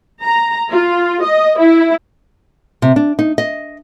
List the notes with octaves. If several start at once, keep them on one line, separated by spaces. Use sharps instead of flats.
A#5
F4
D#5
E4
C3
D4
D#4
D#5